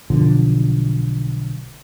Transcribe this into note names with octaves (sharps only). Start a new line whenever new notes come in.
B1 B2 D3 F3